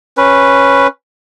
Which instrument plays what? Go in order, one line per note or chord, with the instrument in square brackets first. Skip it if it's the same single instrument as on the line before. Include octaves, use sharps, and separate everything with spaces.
[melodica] C#4 B4